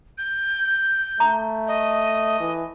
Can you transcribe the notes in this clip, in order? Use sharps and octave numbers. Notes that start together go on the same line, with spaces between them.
G6
A3 A#5
D#5
E3